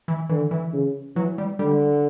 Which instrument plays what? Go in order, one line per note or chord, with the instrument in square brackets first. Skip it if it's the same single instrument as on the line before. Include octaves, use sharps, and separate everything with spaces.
[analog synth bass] E3
[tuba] D3 [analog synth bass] E3
[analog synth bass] E3
[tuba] C#3
[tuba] E3 [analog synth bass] F#3
[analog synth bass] G3
[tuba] D3 [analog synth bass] G3